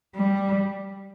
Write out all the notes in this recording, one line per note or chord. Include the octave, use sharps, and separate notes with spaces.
G3